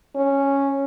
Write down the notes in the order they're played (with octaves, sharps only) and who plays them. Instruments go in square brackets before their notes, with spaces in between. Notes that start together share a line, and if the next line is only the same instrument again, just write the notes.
[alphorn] C#4